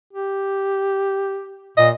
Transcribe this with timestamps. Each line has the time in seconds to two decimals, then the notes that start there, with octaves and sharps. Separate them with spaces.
0.13 G4
1.77 A#2 D#5